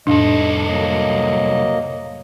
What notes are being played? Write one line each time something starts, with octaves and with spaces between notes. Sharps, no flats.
C2 F2 A2 D4 A4 D#5
F#3 A#3 D#5